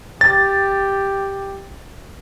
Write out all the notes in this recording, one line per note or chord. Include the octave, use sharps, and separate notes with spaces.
G4 A6